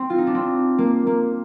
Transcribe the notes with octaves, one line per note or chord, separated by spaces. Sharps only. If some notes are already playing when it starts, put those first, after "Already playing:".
Already playing: C4
F4
D#4
D4
C4
A#3
A#3